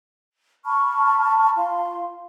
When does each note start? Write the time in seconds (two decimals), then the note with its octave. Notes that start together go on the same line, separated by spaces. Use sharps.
0.65 A5 B5 C#6 F6
1.57 F4 F5 C6